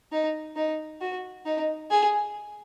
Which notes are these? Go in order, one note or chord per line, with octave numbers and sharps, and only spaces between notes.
D#4
D#4
F#4
D#4
G#4